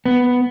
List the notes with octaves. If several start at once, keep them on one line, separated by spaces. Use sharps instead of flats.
B3